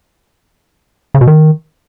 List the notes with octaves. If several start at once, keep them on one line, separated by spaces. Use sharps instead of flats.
C#3
B2
D#3